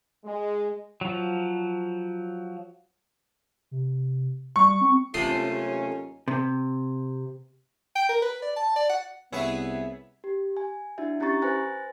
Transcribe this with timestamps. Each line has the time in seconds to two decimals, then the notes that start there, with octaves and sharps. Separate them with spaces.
0.24 G#3
1.01 F3 F#3
3.71 C3
4.56 G3 C#6
4.81 C4
5.14 D#2 C3 F#3 A3 C#4 F4 C6 D#6
6.28 C3
7.96 G5
8.09 A#4
8.22 B4
8.42 D5
8.56 A5
8.76 D5
8.89 F#5
9.33 C2 B3 E4 G#4 B4 C#5 E5
10.24 G4
10.57 G#5
10.98 D4 E4 F#4 E5
11.20 C#4 E4 G4 A#5 C#6 A6
11.42 B4 C5 G#5 F#6 A6 A#6